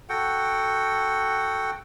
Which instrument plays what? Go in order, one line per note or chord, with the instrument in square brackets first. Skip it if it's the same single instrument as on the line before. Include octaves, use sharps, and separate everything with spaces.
[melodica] F#4 A4 F#5 G5